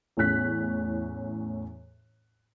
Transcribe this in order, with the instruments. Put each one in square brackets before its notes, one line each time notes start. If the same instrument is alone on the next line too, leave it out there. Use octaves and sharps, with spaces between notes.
[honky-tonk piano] E2 A2 C#4 F#6 B6